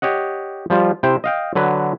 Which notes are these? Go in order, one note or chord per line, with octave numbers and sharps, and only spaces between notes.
G4 C#5 D#5 F#5
F3 G3 F4
C3 E4 C5 G5
D#5 F5 G5
D3 F#3 B4